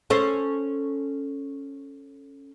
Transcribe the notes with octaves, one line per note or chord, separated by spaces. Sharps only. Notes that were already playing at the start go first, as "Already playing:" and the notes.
C#4 A4 C5